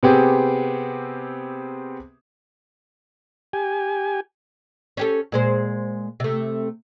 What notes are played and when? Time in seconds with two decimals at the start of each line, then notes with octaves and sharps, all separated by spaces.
0.03 C3 B3 C4 G4 G#4
3.53 G4 G#5
4.97 C#4 G4 A4
5.32 A#2 G#3 C5
6.20 C3 A3